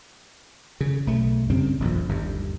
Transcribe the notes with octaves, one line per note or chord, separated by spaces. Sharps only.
C#3
B1 A3
G2 C#3 G3 C4
D#1 A#1 F2
G1 D#2